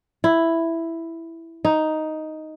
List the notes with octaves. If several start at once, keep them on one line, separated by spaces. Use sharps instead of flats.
E4
D#4